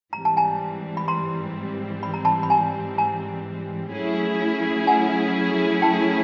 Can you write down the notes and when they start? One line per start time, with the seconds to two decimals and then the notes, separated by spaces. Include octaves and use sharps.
0.13 G#2 E3 G3 C4 A#5
0.25 A5
0.37 G#5 A#5
0.97 B5
1.08 A#5 C6
2.03 B5
2.14 A#5
2.25 A5 B5
2.43 B5
2.50 G#5 A#5
2.98 G#5 A#5
3.93 F#3 A3 C#4 E4 G#4
4.87 F#5 G#5
5.82 G5 A5